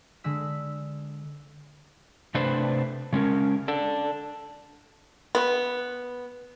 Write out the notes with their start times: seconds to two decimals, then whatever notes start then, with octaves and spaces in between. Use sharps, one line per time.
0.24 D3 G#3 E6 B6
2.35 C3 A3 D4 B4 C5
3.13 C#3 G#3 C#4 A#4
3.68 D4 A4
5.35 B3